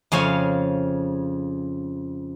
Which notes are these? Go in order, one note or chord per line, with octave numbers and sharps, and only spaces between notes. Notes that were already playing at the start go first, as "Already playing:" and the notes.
F2 C#3 G#4 C#5 F5 G#5